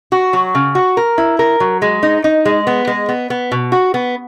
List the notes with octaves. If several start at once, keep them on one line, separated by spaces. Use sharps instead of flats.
F#4
F#3
C#3
F#4
A#4
E4
A#4
F#3
G#3
D#4
D#4
G#3
B3
G#3
B3
B3
B2
F#4
B3